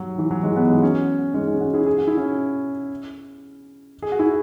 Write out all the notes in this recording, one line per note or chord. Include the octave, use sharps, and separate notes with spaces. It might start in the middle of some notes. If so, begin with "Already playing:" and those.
Already playing: F#3
E3
F#3
E3 G#3
F#3 B3
E3 G#3
C#4 F#4
G#3 C#4
G#3 C#4
C#4 F#4
E4 G#4
G#4
F#4
E4
C#4 F#4
G#4
F#4
E4 G#4